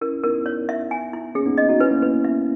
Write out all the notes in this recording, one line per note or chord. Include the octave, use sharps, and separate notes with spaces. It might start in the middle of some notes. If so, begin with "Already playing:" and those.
C#4 E4 A#4
B3 D#4 A#4
C#5
E5
G#5
E4
A#3 C#4 G#4
B3 D#4
D#5
D#4 F#4
C#4 E4 B4
A#3
B3 B4
E5